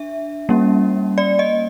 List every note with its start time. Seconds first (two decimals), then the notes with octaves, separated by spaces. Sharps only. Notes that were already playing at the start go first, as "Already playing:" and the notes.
Already playing: D4 E5
0.49 G3 A#3 C#4
1.18 D5
1.39 D#5